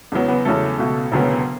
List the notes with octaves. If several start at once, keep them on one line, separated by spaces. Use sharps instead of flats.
E2 C#3 F#3 B3
B3 B4
E2 C#3 F#3 A3 A4
C#2 B2 A3
E1 D2 C#3 F#3 B3